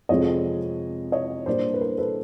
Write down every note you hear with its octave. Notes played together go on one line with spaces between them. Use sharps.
F2 C3 F3 G#3 C4 C#5 D#5
C#5 D#5
A#2 G3 A#3 D4 C5 D5
B4
A#4 C5
A4 B4